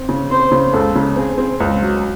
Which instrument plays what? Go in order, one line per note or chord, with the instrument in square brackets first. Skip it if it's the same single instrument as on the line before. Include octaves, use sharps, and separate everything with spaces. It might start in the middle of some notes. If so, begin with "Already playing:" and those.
Already playing: [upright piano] C4
C#3
[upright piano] C4 [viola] C5
[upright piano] C#3
[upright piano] C#2 [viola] A4
[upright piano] C#3
[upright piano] C4 [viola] G#4
[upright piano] C4
C#2
F#3